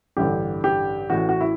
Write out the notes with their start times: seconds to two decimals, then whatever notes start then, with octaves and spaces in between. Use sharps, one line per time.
0.17 A1 G2 D3 G4
0.64 G4
1.10 A1 A2 E3 F#4
1.29 F#4
1.41 E4